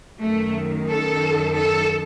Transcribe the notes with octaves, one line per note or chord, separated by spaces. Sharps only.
F#2 D#3 A3
A4
A4